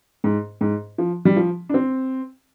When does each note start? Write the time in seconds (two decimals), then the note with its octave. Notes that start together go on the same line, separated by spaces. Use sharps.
0.24 G#2
0.61 G#2
0.98 F3
1.25 G3
1.36 F3
1.69 D4
1.74 C4